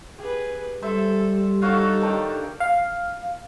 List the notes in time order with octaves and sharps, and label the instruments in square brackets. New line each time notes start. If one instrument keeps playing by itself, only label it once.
[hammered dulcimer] G4 [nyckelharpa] G#4 B4
[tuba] G3 [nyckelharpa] A4 [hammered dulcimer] C5 E5
[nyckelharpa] D#4 A4 [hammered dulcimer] F#4 C#5 F5
[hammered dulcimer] D#3 D4 G4
[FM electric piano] F5